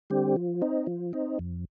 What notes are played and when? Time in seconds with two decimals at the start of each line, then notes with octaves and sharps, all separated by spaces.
0.10 D3 G3 C4 G4
0.36 F3
0.62 C4 D#4
0.87 F3
1.13 C4 D#4
1.39 F2